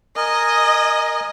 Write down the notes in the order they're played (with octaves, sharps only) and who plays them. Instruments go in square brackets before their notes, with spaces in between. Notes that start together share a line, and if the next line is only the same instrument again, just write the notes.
[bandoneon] A#4 G#5 [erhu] D#5